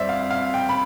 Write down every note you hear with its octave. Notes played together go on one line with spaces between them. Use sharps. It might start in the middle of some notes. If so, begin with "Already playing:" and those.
Already playing: F2 G3 C5 D5 E5
F5
F5
G5
B5